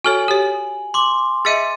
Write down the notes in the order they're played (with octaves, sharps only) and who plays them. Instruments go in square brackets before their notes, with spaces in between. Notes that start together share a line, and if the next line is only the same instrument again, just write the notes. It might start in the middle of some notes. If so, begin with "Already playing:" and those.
[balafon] F#4 A4 C#5 [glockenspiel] G#5 F#7
[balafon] G4 C#5
[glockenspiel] C6 D6
[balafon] G#4 D#5 E5 [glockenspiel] A6 C#7 D#7